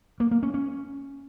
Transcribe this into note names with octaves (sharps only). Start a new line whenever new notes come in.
A#3
A#3
C#4
C#4